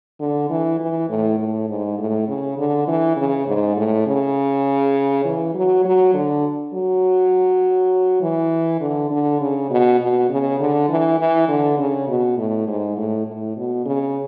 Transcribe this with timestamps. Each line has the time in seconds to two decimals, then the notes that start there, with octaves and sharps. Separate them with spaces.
0.20 D3
0.50 E3
0.80 E3
1.09 A2
1.39 A2
1.69 G#2
1.99 A2
2.28 C#3
2.58 D3
2.88 E3
3.17 C#3
3.47 G#2
3.77 A2
4.07 C#3
5.25 E3
5.55 F#3
5.85 F#3
6.14 D3
6.73 F#3
8.22 E3
8.81 D3
9.11 D3
9.41 C#3
9.70 B2
10.00 B2
10.30 C#3
10.60 D3
10.89 E3
11.19 E3
11.48 D3
11.78 C#3
12.08 B2
12.37 A2
12.67 G#2
12.97 A2
13.26 A2
13.56 B2
13.86 C#3